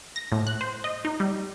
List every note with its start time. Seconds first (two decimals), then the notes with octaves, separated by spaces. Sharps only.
0.16 A#6
0.32 A2
0.47 F#6
0.61 C5
0.84 D#5
1.05 D#4
1.20 G3